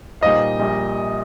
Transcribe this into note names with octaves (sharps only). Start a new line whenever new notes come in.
A#2 G3 D#4 C5 D#5 F5
A#1 A#2 G3